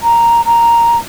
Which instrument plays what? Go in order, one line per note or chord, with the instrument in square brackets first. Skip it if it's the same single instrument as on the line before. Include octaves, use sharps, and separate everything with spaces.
[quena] A#5
A#5